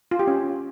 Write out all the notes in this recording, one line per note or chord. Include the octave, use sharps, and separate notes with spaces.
F4
G4
C#4